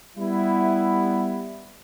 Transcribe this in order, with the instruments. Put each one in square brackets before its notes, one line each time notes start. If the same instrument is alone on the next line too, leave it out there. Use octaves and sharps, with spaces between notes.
[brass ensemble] G3 B3 E4